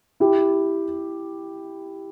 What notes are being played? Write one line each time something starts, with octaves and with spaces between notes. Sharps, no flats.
E4 G4